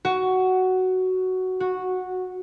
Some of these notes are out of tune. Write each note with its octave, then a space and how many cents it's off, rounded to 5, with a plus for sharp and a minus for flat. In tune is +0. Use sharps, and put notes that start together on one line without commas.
F#4 +10
F#4 -10